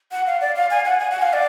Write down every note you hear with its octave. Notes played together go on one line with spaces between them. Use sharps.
F#5
F5
D5
F5
G#5
F#5
G#5
F#5
F5
D5